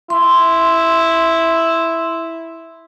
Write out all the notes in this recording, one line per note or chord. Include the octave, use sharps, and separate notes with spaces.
E4 C6